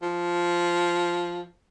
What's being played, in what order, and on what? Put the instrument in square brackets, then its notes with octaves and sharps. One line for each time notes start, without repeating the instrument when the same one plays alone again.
[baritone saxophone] F3